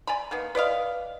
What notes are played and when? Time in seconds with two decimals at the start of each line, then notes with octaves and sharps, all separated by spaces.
0.07 D5 G#5 A#5 B5
0.31 D#3 A#3 B3
0.55 B4 D5 D#5 F5